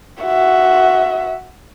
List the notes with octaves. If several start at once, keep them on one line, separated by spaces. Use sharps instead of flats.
F#4 E5